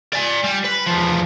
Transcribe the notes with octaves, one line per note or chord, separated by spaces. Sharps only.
D5 G#5
G3
B4
E2 F3